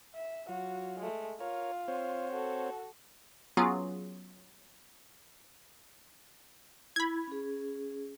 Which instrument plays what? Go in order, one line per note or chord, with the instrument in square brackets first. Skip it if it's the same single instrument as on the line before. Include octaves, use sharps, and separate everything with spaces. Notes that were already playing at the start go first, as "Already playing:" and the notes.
[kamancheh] E5
[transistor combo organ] F#3 F4 [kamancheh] F#4
[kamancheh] G#3 A3
[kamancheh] F4 [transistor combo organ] A#4 C#5
[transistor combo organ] C4 C5 C#5
[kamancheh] F#4 A4
[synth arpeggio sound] F#3 B3 C#4 F4 G#4
[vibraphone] E4 [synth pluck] B5 G#6
[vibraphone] C#4 G#4